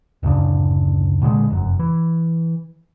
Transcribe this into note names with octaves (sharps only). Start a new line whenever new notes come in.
D1 F#2 C#3 D4
A#2 D3 D#3 G#3
F1 F#2
E3